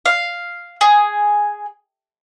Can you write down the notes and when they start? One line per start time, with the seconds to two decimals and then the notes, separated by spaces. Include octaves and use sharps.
0.06 F5
0.81 G#4